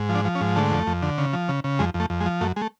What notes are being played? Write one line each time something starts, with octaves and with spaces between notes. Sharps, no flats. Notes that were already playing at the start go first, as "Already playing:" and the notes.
Already playing: G#2
F3
D4
F3
C#4
G#2
D3 A3
F2
F2
D3
C#3
F3
C#3
C#3
F2 G#3
F2
A3
F2
G#3
F3
F#2 A3
G#3
A3